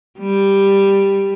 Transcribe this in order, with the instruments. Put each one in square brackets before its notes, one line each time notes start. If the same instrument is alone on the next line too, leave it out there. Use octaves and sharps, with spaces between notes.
[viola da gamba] G3